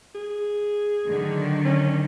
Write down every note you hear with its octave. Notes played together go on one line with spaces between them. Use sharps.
G#4
D3 D#3 F#3
C#4